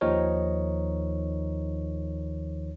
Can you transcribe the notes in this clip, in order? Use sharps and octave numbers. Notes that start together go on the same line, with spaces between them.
D#2 D#3 F3 D#4 A#4 C#5